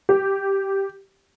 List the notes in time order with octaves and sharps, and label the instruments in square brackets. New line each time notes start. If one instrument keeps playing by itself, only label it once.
[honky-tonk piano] G4